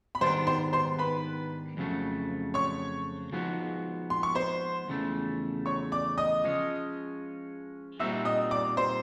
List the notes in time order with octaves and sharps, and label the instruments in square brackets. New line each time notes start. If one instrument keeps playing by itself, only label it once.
[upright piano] B5
[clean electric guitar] G#2 D#3 G3 B3 D4 [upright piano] C5 C6
[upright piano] C5 C6
C5 C6
B4 B5
[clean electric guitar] F2 C#3 F#3 A3
[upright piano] C#5 C#6
[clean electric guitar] F3 G#3 B3 D#4 F#4
[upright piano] C6
C#6
C5 C6
[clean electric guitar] E2 C#3 F3 A3
[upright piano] C#5 C#6
D5 D6
D#5 D#6
[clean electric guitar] F3 G#3 C#4
[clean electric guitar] A#2 G3 C4 D#4 F#4 [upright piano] E5 E6
[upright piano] D#5 D#6
D5 D6
C5 C6